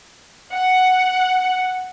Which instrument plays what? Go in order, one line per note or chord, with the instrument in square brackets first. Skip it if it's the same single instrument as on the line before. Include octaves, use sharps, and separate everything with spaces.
[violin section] F#5